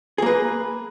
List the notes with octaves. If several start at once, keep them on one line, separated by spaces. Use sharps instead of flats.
A#3 G#4 B4